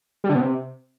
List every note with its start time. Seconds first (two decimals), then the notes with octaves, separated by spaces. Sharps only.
0.24 G3
0.29 D3
0.35 B2
0.41 C3